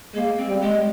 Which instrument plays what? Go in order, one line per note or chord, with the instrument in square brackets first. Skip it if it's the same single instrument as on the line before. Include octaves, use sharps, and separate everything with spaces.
[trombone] G#3 [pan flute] A#3
[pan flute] C4
[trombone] G3
[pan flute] G#3